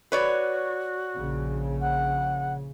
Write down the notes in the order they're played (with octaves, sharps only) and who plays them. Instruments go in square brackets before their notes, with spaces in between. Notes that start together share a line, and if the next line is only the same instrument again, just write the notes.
[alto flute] F#4 [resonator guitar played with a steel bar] B4 C#5 D5
[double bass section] A#1 C#3
[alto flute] F#5